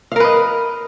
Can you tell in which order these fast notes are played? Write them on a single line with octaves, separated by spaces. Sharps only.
F5 A#4 B4 D#5